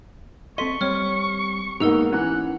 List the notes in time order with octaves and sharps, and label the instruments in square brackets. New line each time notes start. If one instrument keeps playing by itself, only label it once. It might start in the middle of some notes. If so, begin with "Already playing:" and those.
[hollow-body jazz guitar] C4 A4 D#5 [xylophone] C6 B6 [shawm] C#6
[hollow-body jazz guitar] G3 C4 [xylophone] C#5 F6
[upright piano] G#2 A#3 B3 [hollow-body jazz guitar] D#4 G4 [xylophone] A#4 E6 F7
[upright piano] E3 [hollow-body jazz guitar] C#4 A#5 [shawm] F#5